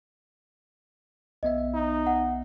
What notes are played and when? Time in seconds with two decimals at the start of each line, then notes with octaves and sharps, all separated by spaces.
1.43 B1 B3 D#5 E5
1.74 D#4
2.07 F#5